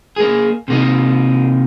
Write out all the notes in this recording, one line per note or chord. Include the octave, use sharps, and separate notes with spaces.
A#3 G#4
C3 A#3 D#4